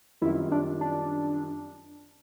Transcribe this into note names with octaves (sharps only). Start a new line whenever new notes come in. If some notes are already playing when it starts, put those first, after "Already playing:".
F#2 D#3 G3 C4 E4 F4
D4
D4